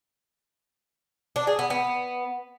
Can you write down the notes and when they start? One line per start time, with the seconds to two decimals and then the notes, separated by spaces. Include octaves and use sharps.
1.36 D4
1.47 G#4
1.59 B3
1.70 B3